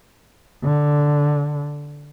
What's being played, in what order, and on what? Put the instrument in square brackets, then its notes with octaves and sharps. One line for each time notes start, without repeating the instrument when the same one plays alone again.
[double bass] D3